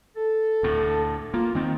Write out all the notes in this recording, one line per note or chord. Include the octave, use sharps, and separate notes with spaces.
A4
D2 A2
A#3 F4
D#3 C4 D#4